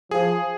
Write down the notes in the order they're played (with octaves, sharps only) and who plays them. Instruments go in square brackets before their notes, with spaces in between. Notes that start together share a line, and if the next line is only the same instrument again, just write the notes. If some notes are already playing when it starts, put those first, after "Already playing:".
[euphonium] F3 [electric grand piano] G#4